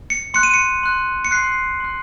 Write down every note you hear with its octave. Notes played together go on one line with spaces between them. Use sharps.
C#7
C6 F#6 C#7
D#7
C#7
C6 F#6
C#7
C6 F#6 C7
C6 F#6